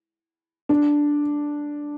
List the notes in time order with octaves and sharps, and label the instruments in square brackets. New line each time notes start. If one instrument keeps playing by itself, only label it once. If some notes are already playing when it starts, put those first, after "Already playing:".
[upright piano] D4